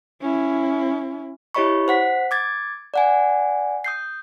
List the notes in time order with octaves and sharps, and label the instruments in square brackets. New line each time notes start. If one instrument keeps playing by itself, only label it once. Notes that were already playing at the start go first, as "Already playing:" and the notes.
[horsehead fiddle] C#4 E4
[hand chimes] E4 G4 C#5 D#5 B5 C#6
C5 F#5 B6
D6 G#6 A6
D5 F#5 G#5
D#6 G6 C7